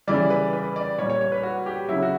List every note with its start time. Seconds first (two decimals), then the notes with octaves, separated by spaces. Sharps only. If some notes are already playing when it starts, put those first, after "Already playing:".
0.08 C#3 E3 G3 D5
0.30 B4
0.53 B4
0.76 D5
0.98 A#2 G3 C#5
1.10 C#5
1.21 C#5
1.32 B4
1.43 F#4
1.66 G4
1.89 C#3 F#3 E4
2.02 F#4